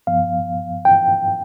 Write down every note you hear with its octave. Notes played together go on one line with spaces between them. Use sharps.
G2 F3 B3 F5
G5